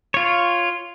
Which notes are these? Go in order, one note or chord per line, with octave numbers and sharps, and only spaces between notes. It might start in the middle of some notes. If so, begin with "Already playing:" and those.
F4 C#5